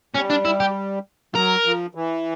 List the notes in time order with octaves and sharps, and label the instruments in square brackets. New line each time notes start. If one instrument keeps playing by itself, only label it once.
[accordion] G3 [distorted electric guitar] C#4
[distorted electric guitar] D4
E4
G4
[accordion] F#3 [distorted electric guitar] A#4
[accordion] F3
E3